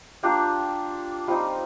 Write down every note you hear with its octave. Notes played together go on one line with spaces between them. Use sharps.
A#3 D4 F4 G4
G3 C4 D#4 F4